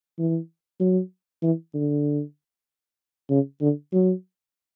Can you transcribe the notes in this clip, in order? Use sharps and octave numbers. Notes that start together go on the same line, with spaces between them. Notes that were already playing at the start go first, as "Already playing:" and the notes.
E3
F#3
E3
D3
C#3
D3
F#3